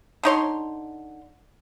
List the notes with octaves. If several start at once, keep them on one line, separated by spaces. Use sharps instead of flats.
D3 D#4 C#5 C6